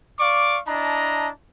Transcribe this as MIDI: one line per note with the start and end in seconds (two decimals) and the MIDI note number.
0.19 0.58 74
0.19 0.58 77
0.19 0.58 85
0.19 0.58 86
0.67 1.29 62
0.67 1.29 64
0.67 1.29 75
0.67 1.29 81
0.67 1.29 82